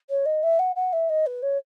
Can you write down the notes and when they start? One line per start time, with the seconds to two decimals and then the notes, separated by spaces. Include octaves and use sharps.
0.09 C#5
0.25 D#5
0.43 E5
0.59 F#5
0.76 F#5
0.93 E5
1.09 D#5
1.26 B4
1.42 C#5